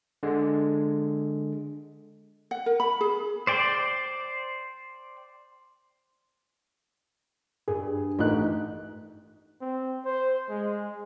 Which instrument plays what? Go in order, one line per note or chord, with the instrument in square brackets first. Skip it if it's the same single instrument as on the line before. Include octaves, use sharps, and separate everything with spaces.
[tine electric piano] D3 G#3
[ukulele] F#5
A#4
B5
G#4
[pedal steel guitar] C5 D5 G5
[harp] G2 [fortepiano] G#4
[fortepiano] A1 F#6 [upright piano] D#4 [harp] G4
[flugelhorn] C4
C5
G#3